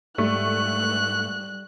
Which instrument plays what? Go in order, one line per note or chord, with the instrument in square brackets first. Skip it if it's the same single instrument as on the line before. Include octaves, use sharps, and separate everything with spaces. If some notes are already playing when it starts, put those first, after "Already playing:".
[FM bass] G#2 [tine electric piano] G3 [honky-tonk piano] A3 [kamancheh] F#6